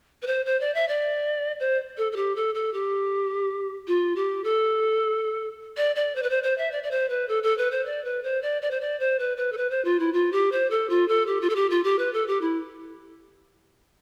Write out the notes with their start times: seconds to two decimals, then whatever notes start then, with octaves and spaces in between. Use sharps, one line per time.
0.22 B4
0.27 C5
0.46 C5
0.60 D5
0.75 E5
0.88 D5
1.60 C5
1.97 A4
2.12 A4
2.16 G4
2.36 A4
2.55 A4
2.74 G4
3.87 F4
4.16 G4
4.44 A4
5.77 D5
5.96 D5
6.16 C5
6.23 B4
6.30 C5
6.43 C5
6.58 E5
6.72 D5
6.83 D5
6.91 C5
7.09 B4
7.28 A4
7.43 A4
7.58 B4
7.71 C5
7.86 D5
8.05 B4
8.24 C5
8.42 D5
8.62 D5
8.71 C5
8.81 D5
9.00 C5
9.19 B4
9.37 B4
9.52 A4
9.57 B4
9.70 C5
9.85 F4
10.00 E4
10.13 F4
10.32 G4
10.52 C5
10.70 A4
10.90 F4
11.08 A4
11.27 G4
11.41 F4
11.50 A4
11.56 G4
11.70 F4
11.84 G4
11.99 B4
12.13 A4
12.27 G4
12.41 E4